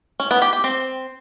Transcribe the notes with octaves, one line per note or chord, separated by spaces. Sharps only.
C#4
B3
G4
G4
C4